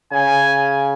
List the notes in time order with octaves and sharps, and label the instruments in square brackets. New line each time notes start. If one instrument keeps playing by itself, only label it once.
[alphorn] C#3 [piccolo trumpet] G#5